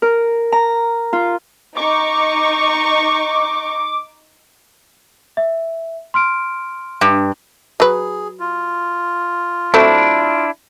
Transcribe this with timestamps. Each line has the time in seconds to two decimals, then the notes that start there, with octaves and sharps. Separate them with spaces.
0.02 A#4
0.52 A#5
1.13 F4
1.77 D#4 C#6 D6
5.37 E5
6.14 C6 F6 D7
7.01 G2
7.80 F#3 G#4 B4
8.40 F4
9.74 F#3 A3 C4 D4 E4